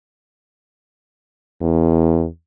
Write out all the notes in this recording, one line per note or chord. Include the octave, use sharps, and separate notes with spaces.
E2